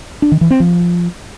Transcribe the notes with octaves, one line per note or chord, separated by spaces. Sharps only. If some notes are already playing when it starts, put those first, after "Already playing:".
D4
D#3
E3
C4
F3